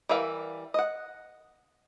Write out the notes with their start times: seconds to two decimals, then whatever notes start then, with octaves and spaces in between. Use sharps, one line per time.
0.09 E3 G3 A#4 E5 F5
0.74 D#5 F#5